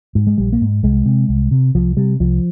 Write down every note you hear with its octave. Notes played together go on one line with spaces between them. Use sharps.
G#2
G#3
A#1 G3
A#3
G#2
C2 G#3
C3
C2
C3
C2 F3
C3 G3
C2 F3